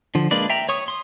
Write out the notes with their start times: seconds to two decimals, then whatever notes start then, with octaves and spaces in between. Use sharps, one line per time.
0.15 D3 F3
0.31 G#3 A#3 D4 B4 D5
0.50 E5 G5 A#5
0.69 C#5 C#6 D#6
0.88 C6 D#6